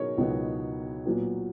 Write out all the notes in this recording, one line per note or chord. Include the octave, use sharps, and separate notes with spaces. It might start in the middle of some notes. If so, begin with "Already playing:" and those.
Already playing: B2 F#3 D#4 G#4 A#4 C#5
C#2 B2 F#3 B3 D#4
A#2 F#3 B3